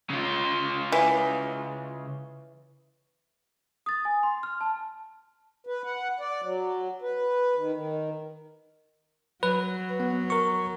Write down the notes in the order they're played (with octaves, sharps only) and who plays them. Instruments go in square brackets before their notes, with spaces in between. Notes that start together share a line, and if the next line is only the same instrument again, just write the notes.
[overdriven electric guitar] C#3 F4
[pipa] E3
[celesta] D#6 A6
G#5
C6
F6
A5
[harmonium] B4
F#5
D5
F#3
B4
D#3
D#3
[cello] F#3 [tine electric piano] B4
[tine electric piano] B3
A#4 C#6